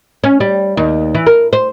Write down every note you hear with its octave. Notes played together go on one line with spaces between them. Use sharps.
C#4
G3
D#2
E3
A#4
C5